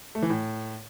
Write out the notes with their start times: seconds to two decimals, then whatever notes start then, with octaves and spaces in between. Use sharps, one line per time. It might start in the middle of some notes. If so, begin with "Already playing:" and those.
0.15 A3
0.22 E3
0.30 A2